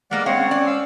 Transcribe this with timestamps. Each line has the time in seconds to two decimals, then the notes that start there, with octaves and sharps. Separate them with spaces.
0.11 G3 G#3 A#3 B3 D5 F#5
0.26 C4 C#5 F5 F#5
0.38 C#4
0.51 D5
0.67 F5 E6